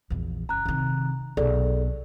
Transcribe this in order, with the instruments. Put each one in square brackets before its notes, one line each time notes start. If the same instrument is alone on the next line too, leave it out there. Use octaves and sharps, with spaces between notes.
[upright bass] A#1 E2
[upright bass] F#1 [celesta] A#5 F#6
[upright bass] C3 D#3
[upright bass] B1 [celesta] G#4 A4 D5